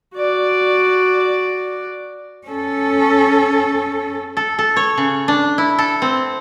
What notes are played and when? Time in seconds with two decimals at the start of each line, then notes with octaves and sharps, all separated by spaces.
0.15 F#4 D5
2.48 C#4 A4
4.37 A4
4.59 A4
4.76 C#5
4.97 C#3
5.28 D4
5.58 E4
5.79 A4
6.02 C4